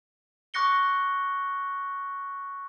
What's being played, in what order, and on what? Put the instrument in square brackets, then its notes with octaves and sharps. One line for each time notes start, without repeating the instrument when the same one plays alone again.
[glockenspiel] C#6 D6 F#6 A#6 C#7 G7